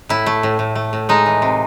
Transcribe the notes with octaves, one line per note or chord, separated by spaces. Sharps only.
A2 E4
A3
A2
A2
A3
A2
G#3 D#4
E3
C3